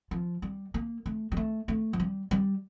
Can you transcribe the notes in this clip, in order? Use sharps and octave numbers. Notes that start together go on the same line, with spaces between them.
F3
G3
A#3
A3
G3
A3
A3
F3
G3
G3